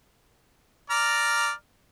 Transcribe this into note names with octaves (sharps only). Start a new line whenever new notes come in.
D5 A#5 F6